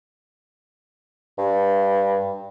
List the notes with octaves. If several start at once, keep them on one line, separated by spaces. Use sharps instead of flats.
G2